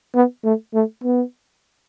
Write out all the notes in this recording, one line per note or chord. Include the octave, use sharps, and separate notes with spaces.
B3
A3
A3
B3